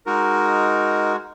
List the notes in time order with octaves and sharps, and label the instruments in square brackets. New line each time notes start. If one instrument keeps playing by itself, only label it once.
[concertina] G#3 D#4 F#4 A#4